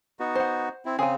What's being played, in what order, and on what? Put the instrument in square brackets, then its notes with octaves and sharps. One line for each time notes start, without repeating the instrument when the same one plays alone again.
[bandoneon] B3 D#4 F#4
[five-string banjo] C5 F#5
[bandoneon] C4 E4
[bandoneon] C#3 C4 [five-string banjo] G#4 G#5